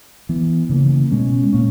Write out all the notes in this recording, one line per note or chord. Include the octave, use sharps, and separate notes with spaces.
E3 B3
C#3 E3 A#3
B2 G#3 C#4
A#2 A#3 C#4